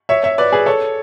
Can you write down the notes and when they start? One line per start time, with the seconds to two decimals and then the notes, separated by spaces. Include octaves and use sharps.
0.09 C#5 E5
0.24 C#5 E5
0.38 B4 D5
0.52 G#4 B4
0.66 A4 C#5